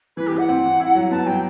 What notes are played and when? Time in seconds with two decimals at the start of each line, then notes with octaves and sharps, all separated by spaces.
0.16 E3 B4
0.27 G4
0.32 E3 F#5
0.49 C4
0.64 E3
0.80 E4
0.95 F#3
1.11 B3 A5
1.26 F#3 G5